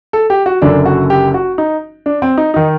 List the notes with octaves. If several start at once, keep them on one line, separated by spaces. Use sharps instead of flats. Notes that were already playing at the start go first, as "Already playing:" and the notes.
A4
G4
F#4
F#1 F#2 D3 D4
F#4
G4
F#4
D#4
D4
C4
D#4
D#3 D#4